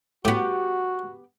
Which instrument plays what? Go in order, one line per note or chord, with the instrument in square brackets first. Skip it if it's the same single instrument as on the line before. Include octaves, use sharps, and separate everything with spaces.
[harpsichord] A2 [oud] B3 G4 [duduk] F#4